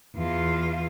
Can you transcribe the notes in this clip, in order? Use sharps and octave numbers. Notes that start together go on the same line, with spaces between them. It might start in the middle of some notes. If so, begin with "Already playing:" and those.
E2 F4